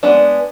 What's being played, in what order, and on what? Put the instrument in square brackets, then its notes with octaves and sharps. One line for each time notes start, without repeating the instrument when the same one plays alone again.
[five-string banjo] G#3 B3 D4